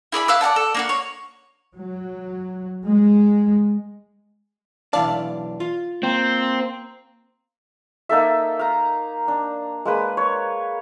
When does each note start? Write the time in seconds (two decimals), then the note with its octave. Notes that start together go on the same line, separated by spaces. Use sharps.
0.12 E4 G#4 D5 B5
0.28 F5 E6 F#6
0.41 D5 F5 F#5 A5
0.56 A4
0.75 A#3 D4 F#4
0.89 C#5
1.75 F#3
2.85 G#3
4.93 B1 E3 D4 D5 F5 A5
5.60 F4
6.03 A#3 C4
8.09 A#3 D#4 A4 E5
8.59 F5 A#5
9.28 D4
9.85 G#3 A#3 B4
10.17 C#5